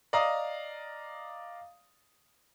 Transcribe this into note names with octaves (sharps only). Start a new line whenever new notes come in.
D5 D#5 F5 A#5 D#6